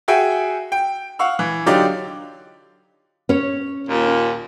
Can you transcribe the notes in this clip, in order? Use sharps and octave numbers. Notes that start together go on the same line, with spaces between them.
F#4 G#4 E5 G5 G#5
G5
F5 F#5 C#6 E6
E3
D3 F#3 D#4 F4 G4 D5
C#4 C#5
D#2 A#2